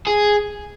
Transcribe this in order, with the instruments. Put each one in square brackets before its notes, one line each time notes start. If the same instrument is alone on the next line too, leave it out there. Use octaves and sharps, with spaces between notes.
[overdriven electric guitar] G#4